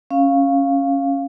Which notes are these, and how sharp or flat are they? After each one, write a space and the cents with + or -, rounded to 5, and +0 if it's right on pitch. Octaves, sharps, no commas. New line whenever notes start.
C#4 -10 F5 +0